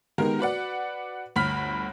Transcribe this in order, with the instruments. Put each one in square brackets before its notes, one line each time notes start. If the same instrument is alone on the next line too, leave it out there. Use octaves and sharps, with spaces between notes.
[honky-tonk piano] D#3 G#3 B3 G4 A#4
F#4 B4 D5 F#5
G1 D2 B5 F6 B6